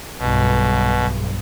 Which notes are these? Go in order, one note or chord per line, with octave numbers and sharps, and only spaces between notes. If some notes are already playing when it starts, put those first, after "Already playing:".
B1 G2 B2